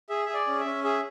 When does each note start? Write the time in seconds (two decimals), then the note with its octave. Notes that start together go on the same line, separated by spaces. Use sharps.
0.09 G#4 E5
0.26 G#4 E5
0.34 D5
0.47 C#4
0.60 E5
0.65 C#4
0.84 G#4 E5